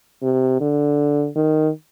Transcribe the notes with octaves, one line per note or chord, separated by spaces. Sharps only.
C3
D3
D#3